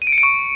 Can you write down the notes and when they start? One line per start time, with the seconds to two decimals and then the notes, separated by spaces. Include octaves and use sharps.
0.02 D#7
0.07 D7
0.12 C#7
0.18 D7
0.23 C#6